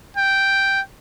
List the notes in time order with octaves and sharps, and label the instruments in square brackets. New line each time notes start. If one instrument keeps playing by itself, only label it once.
[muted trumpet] G5